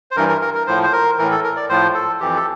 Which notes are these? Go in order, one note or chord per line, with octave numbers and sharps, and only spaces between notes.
C5
G2 E3 A#4
A#4
A#4
A#4
A2 F3 C5
C5
A#4
A2 E3 A#4
A4
A#4
D5
A2 F3 C5
A4
F2 E3 G4
A4